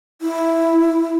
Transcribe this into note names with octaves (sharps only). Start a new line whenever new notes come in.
E4